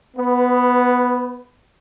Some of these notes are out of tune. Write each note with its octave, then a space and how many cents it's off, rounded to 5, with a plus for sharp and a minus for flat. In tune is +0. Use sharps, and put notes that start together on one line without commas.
B3 +0 B4 +30